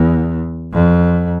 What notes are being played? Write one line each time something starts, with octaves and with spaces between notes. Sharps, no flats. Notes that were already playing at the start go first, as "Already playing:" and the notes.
Already playing: E2
F2